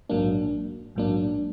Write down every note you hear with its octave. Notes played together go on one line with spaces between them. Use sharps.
A#1 G#2 F#3 A#3 D4
A#1 G#2 F#3 A#3 D4